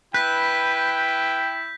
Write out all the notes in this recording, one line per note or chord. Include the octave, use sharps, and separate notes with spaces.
E4 B4 G5 G6 B6